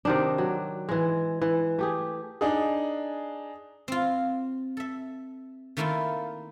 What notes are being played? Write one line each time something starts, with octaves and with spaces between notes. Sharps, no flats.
C3 D#3 D4
F#3
E3 G#3
E3
A3 G4 G#4
D4 D#4 G#4
C4 F4
A4 E5
D#3 A3 A#3 E4 F4